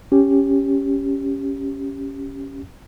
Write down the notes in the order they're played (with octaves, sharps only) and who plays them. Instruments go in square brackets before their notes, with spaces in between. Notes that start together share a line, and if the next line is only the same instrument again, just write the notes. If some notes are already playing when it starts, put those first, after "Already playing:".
[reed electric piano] C#4 G4